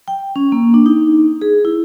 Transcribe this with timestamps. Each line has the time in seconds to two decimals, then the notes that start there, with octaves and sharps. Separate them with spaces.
0.08 G5
0.36 C#4
0.52 A#3
0.74 D4
0.86 D#4
1.41 G#4
1.65 E4